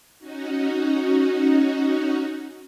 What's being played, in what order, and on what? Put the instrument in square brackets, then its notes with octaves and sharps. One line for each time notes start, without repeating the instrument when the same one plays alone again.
[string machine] C#4 D#4 F#4